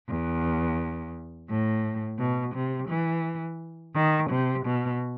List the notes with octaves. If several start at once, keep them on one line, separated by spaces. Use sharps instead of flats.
E2
A2
B2
C3
E3
D#3
C3
B2